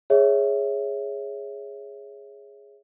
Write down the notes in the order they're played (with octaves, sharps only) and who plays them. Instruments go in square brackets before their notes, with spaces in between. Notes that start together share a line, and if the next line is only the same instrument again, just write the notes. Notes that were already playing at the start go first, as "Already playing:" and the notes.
[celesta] G#4 C#5 E5